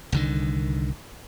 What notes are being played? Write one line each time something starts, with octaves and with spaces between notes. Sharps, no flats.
C2 D3 D#3